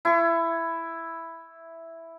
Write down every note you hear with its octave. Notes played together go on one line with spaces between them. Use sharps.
E4 C#6